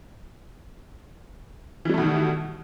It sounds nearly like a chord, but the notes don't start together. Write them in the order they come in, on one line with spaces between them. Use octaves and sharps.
E3 G3 A3 B2 D#3